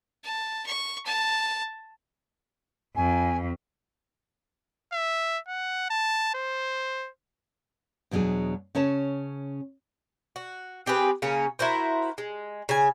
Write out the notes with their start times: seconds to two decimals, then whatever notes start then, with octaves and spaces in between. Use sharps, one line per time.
0.24 A5
0.66 C#6
1.06 A5
2.96 F2 G#5
4.93 E5
5.48 F#5
5.90 A5
6.34 C5
8.11 E2 B2 F#3 D4 G#4
8.75 C#3 C#4 C#5 A5
10.36 F#4
10.86 C4 G4 G#4 B4
11.22 C#3 A#3 C#4
11.59 E4 F#4 A#4 C5
12.18 G#3
12.69 C#3 G#5